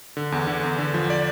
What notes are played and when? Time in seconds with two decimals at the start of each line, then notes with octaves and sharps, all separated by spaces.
0.17 D3
0.32 E2
0.47 D3
0.63 E2
0.79 D3
0.94 F3
1.10 D5